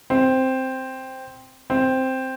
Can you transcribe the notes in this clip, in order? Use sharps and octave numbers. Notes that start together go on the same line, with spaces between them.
C4
C4